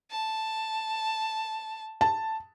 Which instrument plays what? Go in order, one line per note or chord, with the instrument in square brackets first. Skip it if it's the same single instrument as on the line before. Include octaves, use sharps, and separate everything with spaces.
[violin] A5
[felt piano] A5